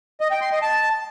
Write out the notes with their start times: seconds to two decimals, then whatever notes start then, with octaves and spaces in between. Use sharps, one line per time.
0.21 D#5
0.31 G5
0.41 C6
0.52 D#5
0.62 A5